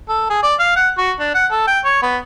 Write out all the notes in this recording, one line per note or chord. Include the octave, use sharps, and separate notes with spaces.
A4
G#4
D5
F5
F#5
F#4
D4
F#5
A4
G5
C#5
B3